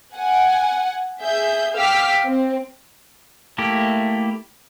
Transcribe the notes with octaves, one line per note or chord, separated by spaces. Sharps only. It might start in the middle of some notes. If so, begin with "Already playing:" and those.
F#5 G#5
G#4 E5 G6
F5 G5 D6 E6 F6 B6
C4
A3 A#3 E4 G4